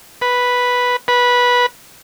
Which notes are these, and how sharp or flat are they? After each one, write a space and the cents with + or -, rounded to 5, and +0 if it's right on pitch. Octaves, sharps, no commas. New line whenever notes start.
B4 -5
B4 -15